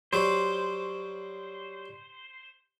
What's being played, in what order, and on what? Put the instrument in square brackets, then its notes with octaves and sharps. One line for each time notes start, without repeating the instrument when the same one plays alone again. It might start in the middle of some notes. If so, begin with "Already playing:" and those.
[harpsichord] F#3 G3 [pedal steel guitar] C5